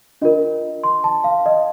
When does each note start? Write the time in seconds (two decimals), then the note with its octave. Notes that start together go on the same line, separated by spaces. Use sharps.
0.22 D4 F4 A#4 D#5
0.84 C6
1.04 A5
1.24 F5
1.46 D#5